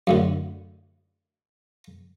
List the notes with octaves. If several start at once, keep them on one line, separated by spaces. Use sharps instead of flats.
F#2 A2 D3